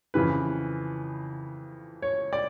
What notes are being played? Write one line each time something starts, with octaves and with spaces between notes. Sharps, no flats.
F2 C#3 E3 B4
C#5
D5